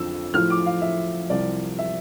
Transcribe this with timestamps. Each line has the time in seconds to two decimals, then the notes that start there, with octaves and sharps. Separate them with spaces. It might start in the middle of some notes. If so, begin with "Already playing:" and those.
Already playing: F2 D3 F3 E6
0.34 A2 F3 F6
0.50 D6
0.66 F5
0.82 E5
1.30 C2 C3 F3 D5
1.79 E5